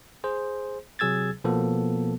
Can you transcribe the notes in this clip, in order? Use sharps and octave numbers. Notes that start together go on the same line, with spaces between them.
G#4 C5
C3 F#3 G#4 E6 G#6 A6
B2 F3 A#3 B3 A4